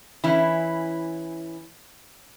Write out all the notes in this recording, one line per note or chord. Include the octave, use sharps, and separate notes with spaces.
E3 C#4 E4